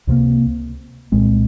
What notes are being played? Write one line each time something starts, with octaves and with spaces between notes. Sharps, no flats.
C#2 C3 F3 A#3
C2 A#2 G#3 C4